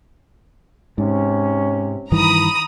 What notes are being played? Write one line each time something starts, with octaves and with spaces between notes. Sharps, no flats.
G#2 C3 C#4
G2 D#3 E3 A#5 B5 D#6